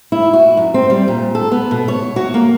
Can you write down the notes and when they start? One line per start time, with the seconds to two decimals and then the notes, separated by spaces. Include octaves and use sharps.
0.12 E4
0.33 F#4
0.57 F#2
0.74 C4
0.90 G3
1.08 A#2
1.35 A4
1.52 B3
1.71 B2
1.88 C#5
2.16 F#4
2.34 A#3